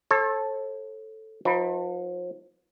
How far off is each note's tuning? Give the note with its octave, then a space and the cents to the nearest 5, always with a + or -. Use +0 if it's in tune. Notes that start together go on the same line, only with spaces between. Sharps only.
A4 +0 C#5 -45
F3 +40 D#4 +35 B4 +0